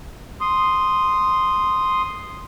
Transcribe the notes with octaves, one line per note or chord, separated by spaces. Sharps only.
C6 D#6